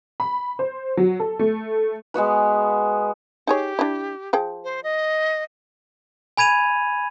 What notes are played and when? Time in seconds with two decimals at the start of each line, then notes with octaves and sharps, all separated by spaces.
0.20 B5
0.59 C5
0.97 F#3
1.20 A4
1.39 A3
2.14 G#3 B3 F#4 B4
3.47 D#4 G4 G#4 C#5
3.79 D4 E4
4.33 F3 G#4 G5
4.64 C5
4.83 D#5
6.37 G#5 B5 G#6 D#7 F7